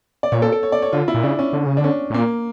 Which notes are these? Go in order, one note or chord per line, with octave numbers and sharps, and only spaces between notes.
D5
A#2 C#5
A4
A4
C#5
D5
C#5
D3 F4
E4
A#2
C#3 D4
C#4
D3
C#3
D3 D4
C#4
A2
A#2 A#3